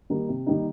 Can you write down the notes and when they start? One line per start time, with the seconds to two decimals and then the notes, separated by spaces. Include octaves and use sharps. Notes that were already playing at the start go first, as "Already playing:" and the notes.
0.10 D#3 G3 A#3 D#4
0.29 C3
0.46 D#3 G3 A#3 D#4